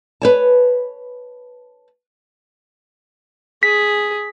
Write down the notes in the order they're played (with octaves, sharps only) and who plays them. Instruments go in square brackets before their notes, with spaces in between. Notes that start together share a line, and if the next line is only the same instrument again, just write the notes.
[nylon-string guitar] B4 C#5 A5
[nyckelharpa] G#4 [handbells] B6